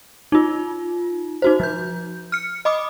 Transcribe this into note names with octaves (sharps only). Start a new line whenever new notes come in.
D#4 F4
D#4 F#4 C5
F3 G6
F6 C#7
D#5 B5 D6 D#6